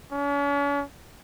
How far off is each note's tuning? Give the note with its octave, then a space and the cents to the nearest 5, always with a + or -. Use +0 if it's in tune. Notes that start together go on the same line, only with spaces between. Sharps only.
C#4 +40